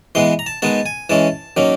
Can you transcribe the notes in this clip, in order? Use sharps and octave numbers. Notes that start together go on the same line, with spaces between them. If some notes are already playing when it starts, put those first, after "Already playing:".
E3 G#3 B3 C6
A#5
A5
D#3 G#3 B3 A5
G#5
E3 G#3 C#4 A5
D#3 F#3 A#3 C#4